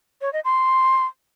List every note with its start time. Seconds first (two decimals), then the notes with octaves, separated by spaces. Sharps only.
0.21 C#5
0.33 D#5
0.45 C6